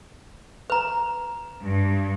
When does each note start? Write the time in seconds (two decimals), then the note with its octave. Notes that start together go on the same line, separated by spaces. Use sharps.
0.70 B4 A#5
1.63 G2